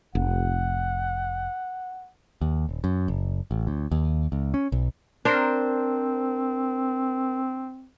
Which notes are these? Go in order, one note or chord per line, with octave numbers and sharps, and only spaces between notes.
F1 F#5
D#2
D#1
F#2
F#1
A1
D2
D#2
C#2
C#4
B1
C4 D4 A#4 C5